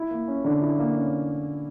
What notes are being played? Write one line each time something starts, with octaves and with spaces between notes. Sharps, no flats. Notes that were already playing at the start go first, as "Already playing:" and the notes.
Already playing: E4
A#3
C#4
D3
E4
A#3
C#4